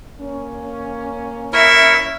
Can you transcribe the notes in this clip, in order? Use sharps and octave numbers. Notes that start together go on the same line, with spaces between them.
A#3 C#4
E4 A#4 C#5 E5